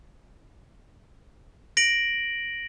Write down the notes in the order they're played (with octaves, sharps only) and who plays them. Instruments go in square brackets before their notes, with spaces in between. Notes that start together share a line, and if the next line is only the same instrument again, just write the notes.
[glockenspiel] A#6 D7 F#7